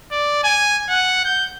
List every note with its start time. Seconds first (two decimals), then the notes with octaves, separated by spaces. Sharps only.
0.11 D5
0.44 G#5
0.89 F#5
1.25 G6